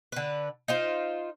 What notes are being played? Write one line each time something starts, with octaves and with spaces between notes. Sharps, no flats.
D3 B4
D#4 F4 C5